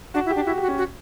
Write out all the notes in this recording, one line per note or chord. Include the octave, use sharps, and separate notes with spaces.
D4 F#4
E4
G4
D4
E4 F#4
G4
F#4
C#4
F#4